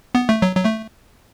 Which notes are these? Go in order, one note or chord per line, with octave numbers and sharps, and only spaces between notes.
B3
A3
F#3
F#3
A3